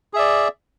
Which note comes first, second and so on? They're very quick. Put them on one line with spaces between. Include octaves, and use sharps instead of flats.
G#4 E5 D5